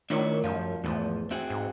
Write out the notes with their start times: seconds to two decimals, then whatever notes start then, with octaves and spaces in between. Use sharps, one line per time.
0.10 D#3 A3 D4 E4 F4 A#4 C#5
0.44 F#2 F3 G3 F5
0.84 E2 G#2 E3 F3 A3
1.31 C4 F#4 G#4 E5 G5
1.50 G#2